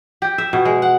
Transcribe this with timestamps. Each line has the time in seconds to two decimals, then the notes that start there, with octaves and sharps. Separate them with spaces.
0.22 G4
0.38 E5
0.53 B2
0.65 G#3
0.82 F#5